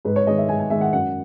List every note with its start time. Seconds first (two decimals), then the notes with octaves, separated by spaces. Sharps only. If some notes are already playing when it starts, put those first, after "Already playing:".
0.05 G#2 B4
0.16 C#5
0.27 D#3 G#3 D#5
0.38 E5
0.49 G#2 G#5
0.59 G#5
0.70 D#3 G#3 E5
0.81 F#5
0.93 F#2 F#5